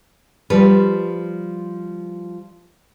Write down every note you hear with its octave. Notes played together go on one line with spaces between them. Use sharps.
F3 G3 B4